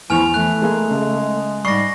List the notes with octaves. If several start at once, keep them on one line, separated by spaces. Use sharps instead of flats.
E2 F3 E4 G#5 C#6 F6 F7
E3 A3 F#6
G#3 A#3 G#4
C#3 G#3
G#2 G3 C#6 A#6 C7